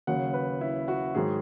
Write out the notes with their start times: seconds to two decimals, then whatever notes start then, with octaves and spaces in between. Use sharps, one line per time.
0.07 D#2 C#3 F#3 F#5
0.34 B4
0.61 E4
0.88 F#4
1.15 G#2 D#3 F#3 G#4